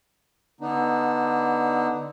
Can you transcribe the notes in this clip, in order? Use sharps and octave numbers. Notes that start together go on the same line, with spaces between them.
D3 B3 D4 D#4